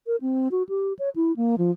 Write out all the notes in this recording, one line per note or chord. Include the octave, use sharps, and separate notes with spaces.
A#4
C4
F#4
G4
C#5
E4
A#3
F3